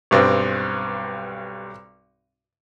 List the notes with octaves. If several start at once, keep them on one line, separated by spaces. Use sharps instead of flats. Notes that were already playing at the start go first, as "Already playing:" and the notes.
B1 G2 C4